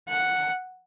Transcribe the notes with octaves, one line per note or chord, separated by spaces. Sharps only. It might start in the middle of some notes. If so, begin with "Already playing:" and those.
F#5